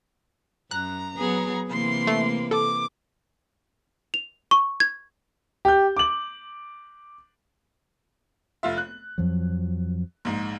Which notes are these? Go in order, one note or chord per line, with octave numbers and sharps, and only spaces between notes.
F#2 A#5 F#6
F#3 B3 G#4
C3 E3 A#3 C6
A3
A4 D6
F7
C#6
G#6
G4 G6
D6 F#7
F1 F4 E5
F#6
F2 F3 F#3
A#1 G#2